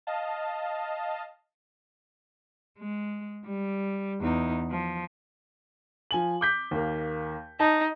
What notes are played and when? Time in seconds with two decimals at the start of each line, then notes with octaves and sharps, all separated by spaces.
0.07 D#5 F5 A5
2.79 G#3
3.46 G3
4.22 E2 D#4
4.71 F3
6.11 F3 G#5 F#7
6.41 D6 G6 B6
6.71 D#2 A#3
7.60 D#4 A5